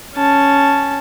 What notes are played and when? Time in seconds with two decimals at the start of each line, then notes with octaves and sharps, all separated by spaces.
0.15 C#4 A5